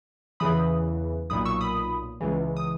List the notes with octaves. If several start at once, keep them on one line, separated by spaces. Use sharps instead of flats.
E2 C#3 E3 B5 D#6
B1 A#2 B5 D#6
C#6 E6
B5 D#6
C#2 C#3 E3
D#6